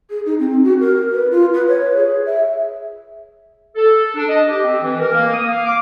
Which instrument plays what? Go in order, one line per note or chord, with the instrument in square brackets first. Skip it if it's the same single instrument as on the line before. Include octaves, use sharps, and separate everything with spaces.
[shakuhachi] G#4
D#4
C4
F#4
A#4
B4
F4
B4
C#5
G#4
E5
[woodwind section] A4
D4
D#5
G4
C4
E3
A#4
A#3
D#6
F5
D6